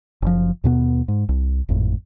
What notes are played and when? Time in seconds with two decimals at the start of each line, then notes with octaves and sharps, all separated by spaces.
0.22 F#1 F3
0.64 D#2 B2 B3
1.08 G#2
1.29 C2
1.69 G#1 F2 A2